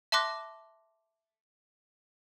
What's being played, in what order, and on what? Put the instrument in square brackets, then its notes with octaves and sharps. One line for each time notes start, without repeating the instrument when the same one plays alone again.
[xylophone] E5 A5 C6 D6 F#6 A#6